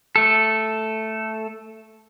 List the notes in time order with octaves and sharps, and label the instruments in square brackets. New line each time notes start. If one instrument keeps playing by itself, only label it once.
[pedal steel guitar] A3 A4